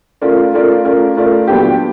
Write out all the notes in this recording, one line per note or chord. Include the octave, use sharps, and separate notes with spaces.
A3 C#4 F4 A#4 D5
A3 C#4 F4 A#4 D5
A3 C#4 F4 A#4 D5
A3 C#4 F4 A#4 D5
A#2 F#3 B3 D4 G4